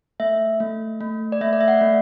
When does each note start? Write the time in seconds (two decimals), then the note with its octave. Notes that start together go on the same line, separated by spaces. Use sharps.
0.20 A3 E5
0.60 A3
1.01 A3
1.32 D5
1.41 A3 E5
1.53 D5
1.61 E5
1.68 F#5
1.81 A3